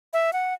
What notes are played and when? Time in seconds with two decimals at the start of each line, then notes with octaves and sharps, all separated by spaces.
0.13 E5
0.33 F#5